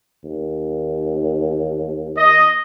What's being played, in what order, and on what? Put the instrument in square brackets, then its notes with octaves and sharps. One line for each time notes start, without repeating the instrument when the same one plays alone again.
[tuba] D#2
[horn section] D#5